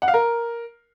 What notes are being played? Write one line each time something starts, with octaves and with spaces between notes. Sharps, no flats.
F#5
F5
A#4